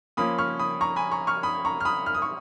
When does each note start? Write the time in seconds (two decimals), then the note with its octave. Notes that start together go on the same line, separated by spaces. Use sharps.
0.17 F3 A#3 C#4 B5 D#6
0.39 C#6 F6
0.59 B5 D#6
0.81 A#5 C#6
0.96 G#5 B5
1.12 A#5 C#6
1.27 C#6 F6
1.43 B5 D#6
1.65 A#5 C#6
1.81 F6
1.85 B5 D#6
2.06 F6
2.15 D#6
2.22 C#6